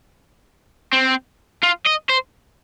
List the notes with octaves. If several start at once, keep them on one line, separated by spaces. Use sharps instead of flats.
C4
F4
D#5
C5